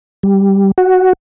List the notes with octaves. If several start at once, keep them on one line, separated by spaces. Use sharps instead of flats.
G3
F#4